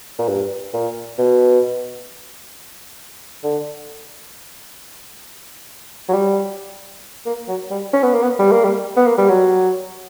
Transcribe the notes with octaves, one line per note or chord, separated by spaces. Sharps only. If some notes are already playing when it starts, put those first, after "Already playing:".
A#2
G2
A#2
B2
D3
F#3
G3
A#3
F#3
G3
C#4
B3
A#3
B3
G3
A#3
G3
B3
A#3
G3
F#3